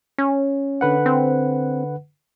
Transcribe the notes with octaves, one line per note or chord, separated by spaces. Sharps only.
C#4
D3 B4 F#5
C4